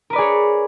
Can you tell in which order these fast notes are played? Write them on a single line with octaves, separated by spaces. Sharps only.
A#4 B4 D5 G#4 C#5